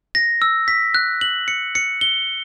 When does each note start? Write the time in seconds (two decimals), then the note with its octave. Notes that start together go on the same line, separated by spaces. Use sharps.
0.15 A#6
0.42 E6
0.68 B6
0.94 F#6
1.21 F#7
1.48 C#7
1.75 C#7
2.01 G7